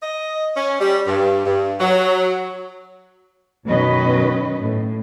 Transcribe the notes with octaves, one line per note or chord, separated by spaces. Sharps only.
D#5
C#4
G3
G2
G2
F#3
F#2 B2 D#3 C#4 B4 D#5
A2